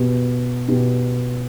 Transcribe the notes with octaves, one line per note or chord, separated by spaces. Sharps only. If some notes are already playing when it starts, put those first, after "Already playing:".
Already playing: B2 B3 G4
B2 B3 G4